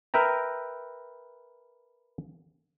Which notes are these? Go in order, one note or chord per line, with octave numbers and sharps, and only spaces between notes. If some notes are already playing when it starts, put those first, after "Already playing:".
A#4 B4 E5 G5 A#5